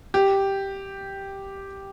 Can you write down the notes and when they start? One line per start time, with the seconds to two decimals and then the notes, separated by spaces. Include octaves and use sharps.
0.14 G4